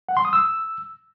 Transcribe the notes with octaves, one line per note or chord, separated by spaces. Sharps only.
F#5
C6
D#6
E6